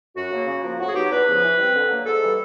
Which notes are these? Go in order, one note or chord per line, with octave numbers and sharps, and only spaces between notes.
F#2 F#4
C#3 F#3 A#3
C#3
F3 A#3
A2 F#4
G#4
F#3 B3 D#4 G4
E2 B4
C#3 F3
E3
G3 C4
D3
F#3 A#3
G#2 A4
E3 G3